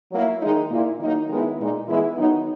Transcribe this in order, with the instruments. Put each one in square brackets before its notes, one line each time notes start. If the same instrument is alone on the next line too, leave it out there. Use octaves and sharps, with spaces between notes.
[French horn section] F#3 A#3 E4
D#3 G#3 D#4
A#2 A#3 E4
D#3 F#3 A#3 D#4
D#3 G#3 B3 E4
A#2 G#3 D#4
E3 G#3 B3 E4
D#3 F#3 B3 D#4